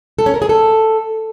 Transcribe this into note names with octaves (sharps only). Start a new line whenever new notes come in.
A4
C#4
A#4
G#4
A4